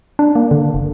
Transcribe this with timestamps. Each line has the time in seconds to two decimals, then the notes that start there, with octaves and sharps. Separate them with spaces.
0.19 D4
0.35 A#3
0.51 D3
0.74 F#1